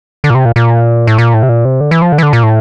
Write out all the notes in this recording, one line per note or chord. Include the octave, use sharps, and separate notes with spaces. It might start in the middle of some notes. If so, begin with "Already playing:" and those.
D3
A#2
C3
A#2
A#2
A2
A#2
A2
C3
A#2
C3
D3
E3
F3
D3
E3
D3
A#2
A2